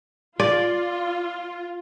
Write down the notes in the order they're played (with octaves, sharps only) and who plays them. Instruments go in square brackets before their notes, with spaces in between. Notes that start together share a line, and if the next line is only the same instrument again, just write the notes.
[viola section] F4 [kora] D5